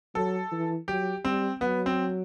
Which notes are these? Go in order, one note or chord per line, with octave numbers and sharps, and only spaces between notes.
F#3 A4
E3
F#3 G4
G3 C4
F#3 B3
C4